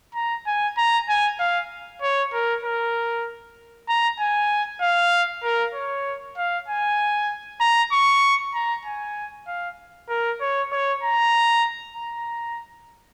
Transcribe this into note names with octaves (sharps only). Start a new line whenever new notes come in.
A#5
G#5
A#5
G#5
F5
C#5
A#4
A#4
A#5
G#5
F5
A#4
C#5
F5
G#5
A#5
C#6
A#5
G#5
F5
A#4
C#5
C#5
A#5
A#5